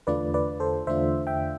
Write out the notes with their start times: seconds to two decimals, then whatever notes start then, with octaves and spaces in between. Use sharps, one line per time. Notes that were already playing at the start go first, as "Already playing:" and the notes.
0.07 E2 D3 A3 D4 F4 B4 D5
0.34 B4 D5
0.60 A4 C5
0.87 E2 D3 A3 D4 F4 C5 E5
1.27 E5 G5